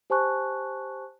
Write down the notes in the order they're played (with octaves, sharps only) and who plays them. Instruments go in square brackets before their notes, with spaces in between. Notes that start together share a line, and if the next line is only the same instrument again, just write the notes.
[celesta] G4 C5 G#5 A5 C#6 F#6